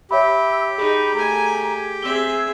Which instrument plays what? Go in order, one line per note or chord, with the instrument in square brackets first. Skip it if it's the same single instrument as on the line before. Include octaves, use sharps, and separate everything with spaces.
[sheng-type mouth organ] G4 [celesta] C#5 E5 B5 [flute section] E6
[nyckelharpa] D#4 [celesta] G#4 [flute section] B5
[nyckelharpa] A3 G#5 [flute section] A#5
[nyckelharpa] C4 E5 [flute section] G#4 E6 [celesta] G7